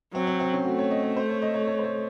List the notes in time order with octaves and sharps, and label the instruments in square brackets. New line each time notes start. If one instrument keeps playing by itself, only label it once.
[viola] F#3 [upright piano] C4
[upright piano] C4
C4
C#4
[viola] A3 [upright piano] F#4
[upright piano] C#5
D#5
C#5
C5
C#5
D#5
C#5
C#5
C5
C#5